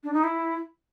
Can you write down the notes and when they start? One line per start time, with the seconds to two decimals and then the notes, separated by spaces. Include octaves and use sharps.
0.04 D4
0.14 D#4
0.24 E4